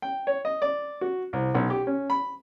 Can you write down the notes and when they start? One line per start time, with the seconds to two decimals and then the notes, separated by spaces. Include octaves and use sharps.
0.02 G5
0.27 C#5
0.45 D#5
0.62 D5
1.01 F#4
1.33 C2
1.55 B1
1.70 G4
1.87 C#4
2.10 B5